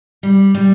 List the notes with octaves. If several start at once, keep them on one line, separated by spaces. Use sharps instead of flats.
G3
G3